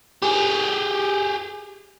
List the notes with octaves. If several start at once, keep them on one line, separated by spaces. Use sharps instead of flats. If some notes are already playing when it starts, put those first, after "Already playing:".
G4 G#4